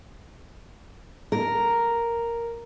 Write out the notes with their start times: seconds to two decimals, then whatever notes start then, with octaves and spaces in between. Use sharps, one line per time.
1.32 A#4